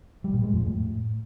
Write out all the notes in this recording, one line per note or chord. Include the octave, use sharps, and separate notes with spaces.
G3
A#2
G#3
F2
A2